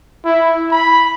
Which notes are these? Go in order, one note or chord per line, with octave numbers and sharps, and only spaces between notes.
E4
B5